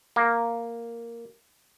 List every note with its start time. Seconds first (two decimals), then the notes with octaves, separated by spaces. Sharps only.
0.16 A#3